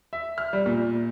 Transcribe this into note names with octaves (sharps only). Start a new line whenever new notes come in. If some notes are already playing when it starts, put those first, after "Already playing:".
E5
F6
G3
A#2